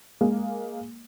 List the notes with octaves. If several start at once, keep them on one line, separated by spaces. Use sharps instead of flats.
G#3 A#3